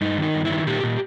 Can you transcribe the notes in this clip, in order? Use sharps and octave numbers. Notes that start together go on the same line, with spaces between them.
G2 D#4
D#3 D#4
G2
D#3 E4
A#2 G4
A#2